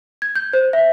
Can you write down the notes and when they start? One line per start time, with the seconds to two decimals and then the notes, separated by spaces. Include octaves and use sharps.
0.22 G#6
0.36 G6
0.53 C5
0.73 E5